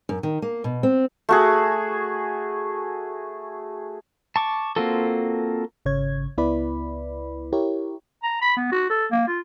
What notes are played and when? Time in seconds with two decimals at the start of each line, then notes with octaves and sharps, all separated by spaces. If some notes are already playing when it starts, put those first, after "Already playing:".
0.09 F#2
0.23 D#3
0.42 A#3
0.64 B2
0.83 C4
1.29 A3 F#4 G#4
4.36 A5 C#6 D6
4.76 A#3 C4 F4 F#4 A4
5.85 G#1 C#3 C#5 G#6
6.38 C#2 B3 E4 B4 D5 B5
7.53 E4 G4 A#4 C#5
8.23 A#5
8.42 B5
8.57 B3
8.72 F#4
8.90 A4
9.12 A#3
9.27 F4